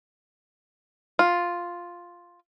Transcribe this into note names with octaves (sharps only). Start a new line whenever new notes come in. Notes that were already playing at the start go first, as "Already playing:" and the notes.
F4